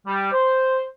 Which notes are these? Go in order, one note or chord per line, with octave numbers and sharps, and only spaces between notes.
G3
C5